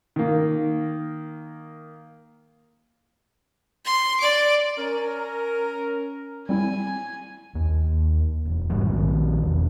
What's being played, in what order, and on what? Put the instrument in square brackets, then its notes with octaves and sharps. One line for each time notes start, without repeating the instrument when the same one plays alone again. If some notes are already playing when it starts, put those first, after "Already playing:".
[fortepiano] D#3 A#3
[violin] C6
D5 D6
[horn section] C#4 A#4
[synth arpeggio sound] G3 C4 E4 [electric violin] G#5
[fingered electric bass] D#2
E1
G#2 E3 F#3 G3
A#1 D#3
E1